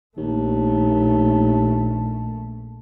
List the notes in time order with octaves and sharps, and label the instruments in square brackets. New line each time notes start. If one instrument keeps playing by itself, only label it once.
[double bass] A#1 A3 [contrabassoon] D#2